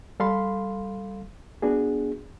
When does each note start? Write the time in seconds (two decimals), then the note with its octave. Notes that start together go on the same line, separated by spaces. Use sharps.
0.20 G3 A4 F5 B5 C6
1.62 B3 D4 F#4 G#4